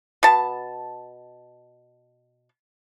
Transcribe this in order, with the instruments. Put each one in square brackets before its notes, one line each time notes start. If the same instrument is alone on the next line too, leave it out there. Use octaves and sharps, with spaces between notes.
[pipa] B2 A5